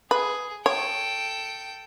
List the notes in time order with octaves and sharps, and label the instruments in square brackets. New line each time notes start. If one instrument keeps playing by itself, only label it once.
[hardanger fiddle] G#4 [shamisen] B4
[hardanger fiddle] A4 G5 [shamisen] C#5